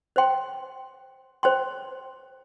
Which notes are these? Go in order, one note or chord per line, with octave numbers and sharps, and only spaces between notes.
C5 G5 C6
C5 G5 C6